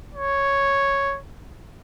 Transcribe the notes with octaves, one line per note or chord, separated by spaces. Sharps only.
C#5